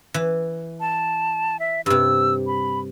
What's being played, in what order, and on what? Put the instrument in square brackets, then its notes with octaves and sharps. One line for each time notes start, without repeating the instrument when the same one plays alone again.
[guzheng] E3
[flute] A5
E5
[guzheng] G2 C3 [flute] E6
[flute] B5